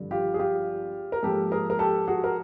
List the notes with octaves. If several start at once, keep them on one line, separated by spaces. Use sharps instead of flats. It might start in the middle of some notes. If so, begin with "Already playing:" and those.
Already playing: G#1 G2 D3 F3
F4 G4
G#4
F4 G4
A#4
G#2 F3 A#3 G4 A4
G#4 A#4
A#4
G4 A4
F#4 G#4
A#4